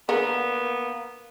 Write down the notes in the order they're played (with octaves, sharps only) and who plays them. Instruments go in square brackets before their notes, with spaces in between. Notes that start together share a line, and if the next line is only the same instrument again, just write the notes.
[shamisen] D3 G#4 A#4 [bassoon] A#3 [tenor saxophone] B3